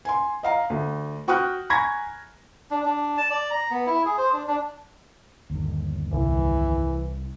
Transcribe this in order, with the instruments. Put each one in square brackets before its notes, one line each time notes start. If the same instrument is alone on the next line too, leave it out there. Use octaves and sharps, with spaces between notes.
[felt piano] G#5 C6
D#5 F5 A#5
D2
F#4 G5 C#6 D#6 F6 F#6
G#5 A#5 B5 C#6 G#6 A#6
[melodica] D4
D4
A5
D5
A#5
B3
E4
G#4
C5
D4
D4
[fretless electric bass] G1 D#2
[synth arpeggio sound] C2 [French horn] E3